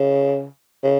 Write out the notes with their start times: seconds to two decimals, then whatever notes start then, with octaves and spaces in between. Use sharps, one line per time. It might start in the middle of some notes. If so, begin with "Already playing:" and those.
Already playing: C#3
0.83 C#3